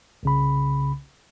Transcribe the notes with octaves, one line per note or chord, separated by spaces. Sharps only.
C2 C#3 B5